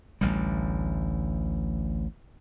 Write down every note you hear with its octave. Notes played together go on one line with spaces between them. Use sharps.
A1 D2 G3